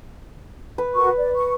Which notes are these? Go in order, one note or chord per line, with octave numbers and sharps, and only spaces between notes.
B4
F#4 A#4 C#6
D5
C#6